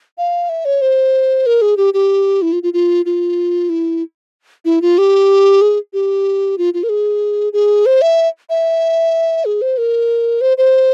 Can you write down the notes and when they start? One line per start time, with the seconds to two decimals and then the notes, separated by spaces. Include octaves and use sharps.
0.18 F5
0.49 E5
0.65 C#5
0.81 C5
1.46 A#4
1.62 G#4
1.77 G4
1.94 G4
2.42 E4
2.52 F4
2.63 F4
2.73 F4
3.05 F4
3.69 E4
4.65 E4
4.82 F4
4.98 G4
5.61 G#4
5.93 G4
6.58 F4
6.74 F4
6.83 A#4
6.89 G#4
7.53 G#4
7.86 C5
8.02 E5
8.50 E5
9.45 G#4
9.62 C5
9.78 A#4
10.41 C5
10.58 C5